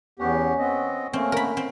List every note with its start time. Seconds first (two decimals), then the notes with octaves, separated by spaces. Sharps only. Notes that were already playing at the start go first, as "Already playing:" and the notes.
0.19 E2 B3 C#4 F#4 G4 C#5
0.58 B3 C4 D#5
1.13 A3 A#3 C4 C#4
1.32 D3 A#4 B5
1.57 C4 G#5